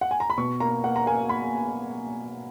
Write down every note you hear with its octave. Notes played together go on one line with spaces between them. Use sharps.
F#5
G#5
A#5
B5
B2 C#6
A#3 A#5
A#3 F#5
A#5
A#3 G#5
A#3 B5